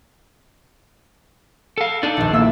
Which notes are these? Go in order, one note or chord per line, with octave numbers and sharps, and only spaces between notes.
A4 F5
D4 D#4 A4 D5
D#1 A#1
A#3 E4 E5 E6